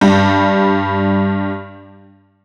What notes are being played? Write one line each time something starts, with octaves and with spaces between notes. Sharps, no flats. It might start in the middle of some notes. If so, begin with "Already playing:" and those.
G2 G3